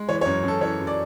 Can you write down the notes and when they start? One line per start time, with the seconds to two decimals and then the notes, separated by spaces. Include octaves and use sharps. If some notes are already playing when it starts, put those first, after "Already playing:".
Already playing: G#3
0.09 E3 C#5
0.21 C#5
0.26 F#2
0.44 F#2 A4
0.61 E3 C#5
0.79 F#2
0.87 D5